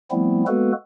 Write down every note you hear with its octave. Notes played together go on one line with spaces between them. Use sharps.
F3 G3 A3 B3 C4 E4
G#3 A#3 B3 F#4 A4 B4